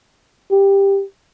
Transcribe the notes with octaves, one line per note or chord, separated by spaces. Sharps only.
G4